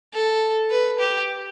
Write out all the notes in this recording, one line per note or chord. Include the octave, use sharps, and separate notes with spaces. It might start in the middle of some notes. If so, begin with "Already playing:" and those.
A4
B4
G4